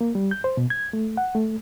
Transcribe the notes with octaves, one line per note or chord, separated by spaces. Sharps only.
A#3
G3
G6
C5
B2
G#6
A3
F#5
A3